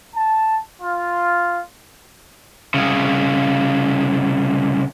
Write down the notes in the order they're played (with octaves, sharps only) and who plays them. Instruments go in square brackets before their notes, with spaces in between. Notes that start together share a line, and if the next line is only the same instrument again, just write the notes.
[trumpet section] A5
F4
[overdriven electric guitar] C2 C#3